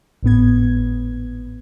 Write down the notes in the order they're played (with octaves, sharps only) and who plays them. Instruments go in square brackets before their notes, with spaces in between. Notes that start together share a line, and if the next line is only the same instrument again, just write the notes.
[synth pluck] G#1 A2 B3 G#6